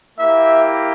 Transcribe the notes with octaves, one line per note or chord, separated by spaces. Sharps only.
A#3 E4 G4 E5